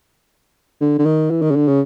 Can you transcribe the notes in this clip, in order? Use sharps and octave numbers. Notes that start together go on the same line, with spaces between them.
D3
D3
D#3
E3
D#3
C#3
D3
C#3